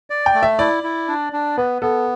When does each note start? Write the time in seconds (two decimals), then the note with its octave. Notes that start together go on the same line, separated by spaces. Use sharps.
0.10 D5
0.26 G5
0.34 A3
0.43 E5
0.59 E4 D5
0.83 E4
1.08 D4
1.33 D4
1.57 B3 B4
1.82 B3 A4